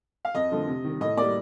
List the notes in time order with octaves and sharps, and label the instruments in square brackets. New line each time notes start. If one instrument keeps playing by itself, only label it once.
[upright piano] F5
F2 D#5
D3 F3 A3
C3
D#3 G3
A2 D#5
G3 A#3 D5